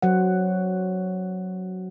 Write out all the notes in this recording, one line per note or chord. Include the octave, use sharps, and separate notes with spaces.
F#3 C5 F#5